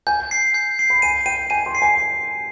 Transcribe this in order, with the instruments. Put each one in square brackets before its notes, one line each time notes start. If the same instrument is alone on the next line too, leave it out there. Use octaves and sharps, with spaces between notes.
[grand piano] G#5 [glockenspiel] G6
[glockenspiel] C7
G6
C7
[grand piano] B5
[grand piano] G#5 [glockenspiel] D#7
[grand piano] G5 [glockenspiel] D#7
[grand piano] G#5 [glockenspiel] D#7
[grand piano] C6
[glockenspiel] C7
[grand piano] G#5